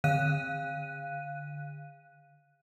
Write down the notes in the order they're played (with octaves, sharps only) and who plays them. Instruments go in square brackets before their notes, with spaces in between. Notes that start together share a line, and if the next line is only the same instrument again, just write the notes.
[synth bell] D3 F5 F#6 D#7